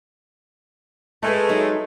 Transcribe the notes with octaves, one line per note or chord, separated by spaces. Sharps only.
G#3 A3 B4 A5
F#3 D#4